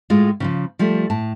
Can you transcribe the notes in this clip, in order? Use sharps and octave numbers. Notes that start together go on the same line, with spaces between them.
A2 G#3 F4
C#3 E3 F3
F3 G3 A3
A2 A5